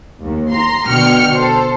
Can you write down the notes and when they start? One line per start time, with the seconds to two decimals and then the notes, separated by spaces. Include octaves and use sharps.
0.23 D#2
0.51 A#5 C6
0.86 B2 D3 G5 F6 C#7
1.35 A4 C5